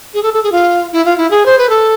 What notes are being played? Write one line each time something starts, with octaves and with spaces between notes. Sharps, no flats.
G#4
A4
A4
G#4
F4
E4
F4
E4
G#4
C5
B4
A4